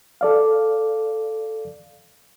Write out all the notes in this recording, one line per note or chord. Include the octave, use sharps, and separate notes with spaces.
A4 D5 F5